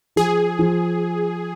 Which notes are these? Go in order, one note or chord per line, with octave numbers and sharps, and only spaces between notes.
F3 G#4
F3